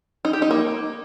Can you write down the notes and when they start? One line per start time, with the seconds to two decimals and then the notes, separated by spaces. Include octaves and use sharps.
0.25 D#4
0.33 G4
0.42 D#4
0.51 A#3